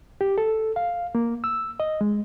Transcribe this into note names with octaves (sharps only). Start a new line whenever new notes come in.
G4
A4
F5
A#3
E6
D#5
G#3